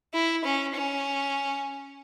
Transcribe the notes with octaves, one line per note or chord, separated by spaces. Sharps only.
E4
C#4
C#4